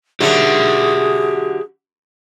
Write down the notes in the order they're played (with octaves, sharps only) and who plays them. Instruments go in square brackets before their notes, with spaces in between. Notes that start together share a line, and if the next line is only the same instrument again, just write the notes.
[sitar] D3 F#3 [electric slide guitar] G4 E5 F#5 [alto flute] G#4